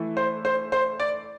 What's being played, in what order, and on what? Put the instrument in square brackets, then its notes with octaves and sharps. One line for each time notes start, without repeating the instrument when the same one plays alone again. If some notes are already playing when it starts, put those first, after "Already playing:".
Already playing: [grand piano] E3 A3 E4
C5
C5
C5
D5